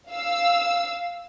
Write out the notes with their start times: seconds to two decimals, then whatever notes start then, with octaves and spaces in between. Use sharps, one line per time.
0.11 F5 E6